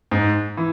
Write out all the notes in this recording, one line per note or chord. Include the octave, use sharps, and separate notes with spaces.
G#2
E3